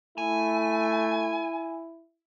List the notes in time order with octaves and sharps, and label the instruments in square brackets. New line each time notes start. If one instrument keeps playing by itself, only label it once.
[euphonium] A3 [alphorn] E4 [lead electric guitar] G#5